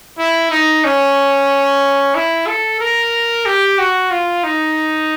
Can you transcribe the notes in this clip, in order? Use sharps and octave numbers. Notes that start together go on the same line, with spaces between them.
E4
D#4
C#4
E4
A4
A#4
G4
F#4
F4
D#4